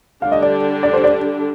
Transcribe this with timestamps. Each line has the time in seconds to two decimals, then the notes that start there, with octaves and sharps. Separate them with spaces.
0.22 D3 G3 D4 G4 F5
0.32 D#5
0.42 D5
0.83 D5
0.93 C5
1.04 D5